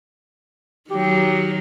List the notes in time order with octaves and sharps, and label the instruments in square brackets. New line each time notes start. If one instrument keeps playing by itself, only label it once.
[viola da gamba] D#3 F#3 [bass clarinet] G4